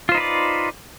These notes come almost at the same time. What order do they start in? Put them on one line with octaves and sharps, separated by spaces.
F4 C5 D#4 B4 D5